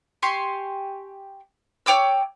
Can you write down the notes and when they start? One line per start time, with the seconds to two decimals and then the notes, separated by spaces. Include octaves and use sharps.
0.22 G4 G#5 C6 C#6
1.86 C#5 G5 D6 E6